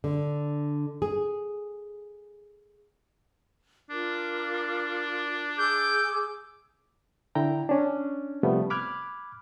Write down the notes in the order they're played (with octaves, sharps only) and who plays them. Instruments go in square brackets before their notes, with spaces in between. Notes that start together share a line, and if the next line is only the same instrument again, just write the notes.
[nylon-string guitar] D3
G#4
[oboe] D4 [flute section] F4 A#4 D6
[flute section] G#4 E6 [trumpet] D6 [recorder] G6
[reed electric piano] D3 E4 G5 A#5
C#4 D4
C3 F3 G3 A3 B3
B5 D6 F6 F#6 G#6